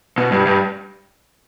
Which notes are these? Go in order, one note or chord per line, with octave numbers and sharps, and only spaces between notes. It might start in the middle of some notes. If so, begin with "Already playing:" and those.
B2
G2
G2